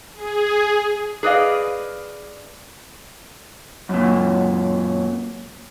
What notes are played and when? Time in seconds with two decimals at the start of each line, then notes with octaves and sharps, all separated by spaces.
0.14 G#4
1.23 G#4 B4 D5 D#5 F5
3.89 F#2 A#2